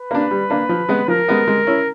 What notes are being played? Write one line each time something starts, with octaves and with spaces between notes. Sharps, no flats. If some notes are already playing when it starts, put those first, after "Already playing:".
Already playing: B4
A#3 D4
G3
A#3 D4
F3
G#3 B3
F3 A#4
G#3 B3
G#3
C#4 E4